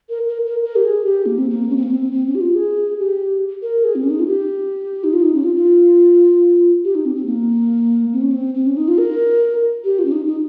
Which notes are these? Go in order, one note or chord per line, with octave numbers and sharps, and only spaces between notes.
A#4
A#4
A#4
A#4
G4
G#4
G4
A#3
C4
A#3
C#4
C4
A#3
C4
C4
C#4
G4
F4
G#4
G4
A#4
G#4
C4
C#4
D#4
F4
G4
D#4
F4
D#4
C#4
F4
F4
G4
D#4
C4
C4
A#3
C4
C#4
C4
C4
C#4
D#4
F4
A#4
G4
F4
C#4
D#4
D#4